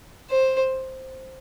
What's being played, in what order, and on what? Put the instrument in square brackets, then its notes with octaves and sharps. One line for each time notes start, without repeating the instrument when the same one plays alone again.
[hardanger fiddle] C5